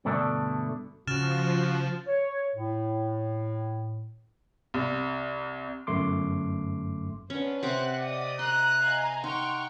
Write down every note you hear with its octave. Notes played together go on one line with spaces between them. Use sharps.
G2 B2 D3 A3 D4
C#3 F3 F#4 F6 A6 E7
C#5
A2
C2
G1 F#2 A3 C6 D6
B3 C#4 D4 C5
C3 C4 C5 F#5 D6 F#6
D5 D#5 D#6
A#5 C6 F#6
D#5 F5 G#5
D#4 F#5 G5 C6 C#6 F6